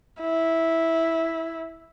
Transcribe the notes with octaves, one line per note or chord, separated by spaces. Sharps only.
E4